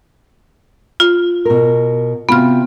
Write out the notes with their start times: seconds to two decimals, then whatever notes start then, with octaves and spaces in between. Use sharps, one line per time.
1.00 F4
1.45 B2 A#4
2.29 C3 B3 F4 F#4 F6